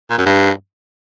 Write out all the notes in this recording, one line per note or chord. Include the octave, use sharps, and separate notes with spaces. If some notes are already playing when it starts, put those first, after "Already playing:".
A#2
F#2
G2